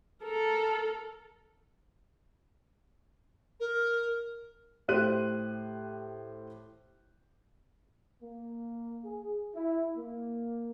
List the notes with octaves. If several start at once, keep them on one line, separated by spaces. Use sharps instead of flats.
A4 A#4
A#4
A2 G4 C5 F#6 D#7
A#3
G#4
E4
A#3